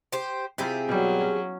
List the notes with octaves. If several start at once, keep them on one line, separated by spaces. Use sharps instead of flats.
G4 C5
C3 C4 E4 F4 G4 G#4
B2 F#3 G3
C#4